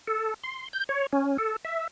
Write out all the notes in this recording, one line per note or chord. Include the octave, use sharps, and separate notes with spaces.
A4
C6
G6
C#5
C#4
A4
E5